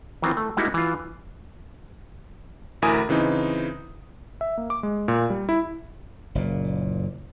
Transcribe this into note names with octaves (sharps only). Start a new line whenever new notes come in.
D#3 E3 C4 F4
A3
G3 G#3 A#3 D#4 E4 F#4
E3 F4
A1 D2 E4 A#4 G#5 D#6
C#3 E3 C4 D#4
E5
A#3
D6
G#3
A#2
G3
E4
F#1 A#2